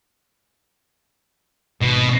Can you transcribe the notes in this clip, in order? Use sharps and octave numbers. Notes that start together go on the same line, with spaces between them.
G#1 G#2 B2